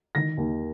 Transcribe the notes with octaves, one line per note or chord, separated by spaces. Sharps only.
D#3 A#6
D#2